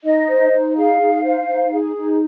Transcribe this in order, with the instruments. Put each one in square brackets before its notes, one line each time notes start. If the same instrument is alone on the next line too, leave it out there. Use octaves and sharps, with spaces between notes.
[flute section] D#4 D#5
C5
D#4
G#4 F5
D#4
C5
D#4
G#4
D#4